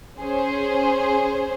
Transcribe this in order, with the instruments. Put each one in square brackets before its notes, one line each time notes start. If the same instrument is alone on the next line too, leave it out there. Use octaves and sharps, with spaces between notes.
[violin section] C#4 G#4 C5